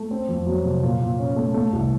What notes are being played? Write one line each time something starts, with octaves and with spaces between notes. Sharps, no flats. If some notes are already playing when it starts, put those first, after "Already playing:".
Already playing: A3
C4
F2
F#3
C3
A#2
A#2
C#4
A3
A3
C2